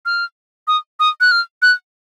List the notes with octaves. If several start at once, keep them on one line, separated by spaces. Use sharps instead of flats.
F6
D#6
D#6
F#6
F6
F#6